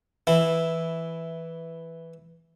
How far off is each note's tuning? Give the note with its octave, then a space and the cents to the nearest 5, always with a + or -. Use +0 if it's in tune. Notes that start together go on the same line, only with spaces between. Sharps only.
E3 +0 E4 -5